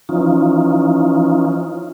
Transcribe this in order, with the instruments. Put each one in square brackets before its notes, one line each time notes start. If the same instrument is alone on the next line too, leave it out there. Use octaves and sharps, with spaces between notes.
[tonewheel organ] E3 F3 C#4 D#4 F4